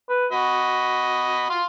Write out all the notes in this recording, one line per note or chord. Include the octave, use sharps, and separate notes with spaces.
B4
F#4 D#5 B5
F5 C6